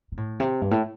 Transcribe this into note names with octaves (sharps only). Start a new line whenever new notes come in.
C3
A2
C3
G2
A2